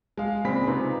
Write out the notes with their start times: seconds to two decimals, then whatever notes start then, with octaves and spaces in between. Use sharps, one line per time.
0.18 G#3 F5
0.44 A#2 C#3 G#3 C4 B5 B6
0.67 C3 D#4 F4 B4